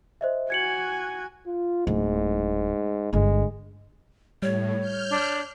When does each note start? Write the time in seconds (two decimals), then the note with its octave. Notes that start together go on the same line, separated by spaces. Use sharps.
0.21 C5 D#5 E5
0.50 F#4 G#5 G#6 C#7 F#7
1.46 F4
1.87 D1 G#2
3.13 G1 D3 G#3
4.42 A2 G3 C#5
4.80 F6 G6
5.10 D4